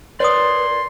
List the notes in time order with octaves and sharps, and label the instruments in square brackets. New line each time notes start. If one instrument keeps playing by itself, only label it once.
[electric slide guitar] A#4 D5 [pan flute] B4 [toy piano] C#5 D#6 [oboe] C6